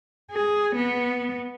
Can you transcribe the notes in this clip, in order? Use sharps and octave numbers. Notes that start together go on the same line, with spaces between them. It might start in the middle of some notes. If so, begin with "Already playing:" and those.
G#4
B3